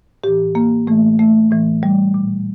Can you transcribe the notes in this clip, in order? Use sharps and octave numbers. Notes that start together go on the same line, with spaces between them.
A2 E3 G4
A#3
A2 E3 A3
A3
A2 E3
G3
A#2